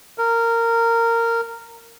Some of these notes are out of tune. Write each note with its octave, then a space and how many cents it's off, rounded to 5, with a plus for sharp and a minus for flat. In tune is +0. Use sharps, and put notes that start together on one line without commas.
A#4 -15